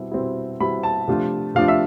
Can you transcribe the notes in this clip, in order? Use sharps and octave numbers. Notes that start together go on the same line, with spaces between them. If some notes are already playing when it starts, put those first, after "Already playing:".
Already playing: B2 G3 C4 E4
B2 G3 C4 E4
B2 G3 C4 E4 B5
A5
C3 F3 A3 D4 F4
C3 F3 A3 D4 F4 F5
E5